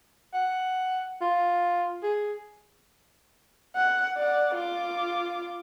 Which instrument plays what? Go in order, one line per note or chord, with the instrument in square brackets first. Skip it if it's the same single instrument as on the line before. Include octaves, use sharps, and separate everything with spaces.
[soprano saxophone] F#5
F4
G#4
[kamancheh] F#5
D5 F#5
F4 D6